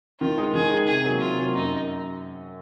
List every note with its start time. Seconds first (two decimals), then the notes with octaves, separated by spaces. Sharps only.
0.20 D#3 F4
0.38 G#3 D#4
0.53 D#3 G#4
0.70 G#3 D#4
0.87 C3 G#4
1.04 F#3 A#3
1.20 C3 F4
1.38 F#3 A#3
1.54 F#2 D#4